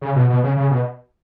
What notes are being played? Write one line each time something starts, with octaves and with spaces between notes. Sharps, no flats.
C#3
B2
B2
C#3
C#3
B2